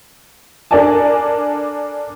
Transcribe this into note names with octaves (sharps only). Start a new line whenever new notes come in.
D4 A4 A#4 D5 G#5 A5